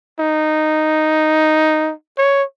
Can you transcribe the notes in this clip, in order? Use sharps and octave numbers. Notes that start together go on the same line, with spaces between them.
D#4
C#5